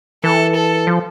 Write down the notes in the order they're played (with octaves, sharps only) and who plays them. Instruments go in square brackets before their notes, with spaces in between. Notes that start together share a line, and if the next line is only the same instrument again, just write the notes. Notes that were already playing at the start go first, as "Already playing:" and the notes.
[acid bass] E3 [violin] A4
[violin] A4
[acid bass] F3